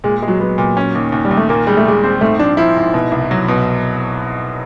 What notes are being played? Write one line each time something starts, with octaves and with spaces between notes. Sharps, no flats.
A#2 G#3
G#3
F#3
F#3 B3
A#2
C#4
D#2
D#2
G3
D#2
A3
A#2 A#3
G3 G#3
A3
A#2 G#3
C4
G#2 A3
F3 D4
F3 E4
G#2
B2
C2
F#3
B2